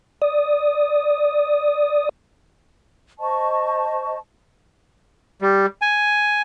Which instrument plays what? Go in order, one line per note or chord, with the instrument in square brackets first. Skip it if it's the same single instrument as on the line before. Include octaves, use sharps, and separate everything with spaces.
[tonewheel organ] D5 D#6
[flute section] C5 D#5 A5 C#6
[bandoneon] G3
G#5